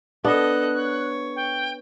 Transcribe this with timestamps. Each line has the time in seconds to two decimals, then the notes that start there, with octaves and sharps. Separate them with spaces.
0.25 B3 D4 A4 D#5 F#6
0.76 C#5
1.36 G5